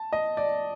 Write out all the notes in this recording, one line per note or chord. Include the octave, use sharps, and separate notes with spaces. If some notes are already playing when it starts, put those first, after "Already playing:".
Already playing: A5
D#5
D5